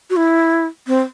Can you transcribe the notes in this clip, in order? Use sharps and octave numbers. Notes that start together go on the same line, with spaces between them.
F#4
E4
C4